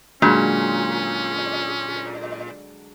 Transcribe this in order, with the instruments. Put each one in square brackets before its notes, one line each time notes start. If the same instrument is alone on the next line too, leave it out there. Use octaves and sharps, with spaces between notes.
[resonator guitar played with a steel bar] A#2 [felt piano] D3 F#3 G#3 [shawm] C#4